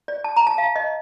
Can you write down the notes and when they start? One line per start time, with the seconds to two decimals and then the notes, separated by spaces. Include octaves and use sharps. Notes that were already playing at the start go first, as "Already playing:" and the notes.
0.08 D5
0.24 A5
0.36 A#5
0.47 A5
0.58 F5
0.76 D#5